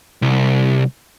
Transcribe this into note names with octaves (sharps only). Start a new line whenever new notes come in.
C2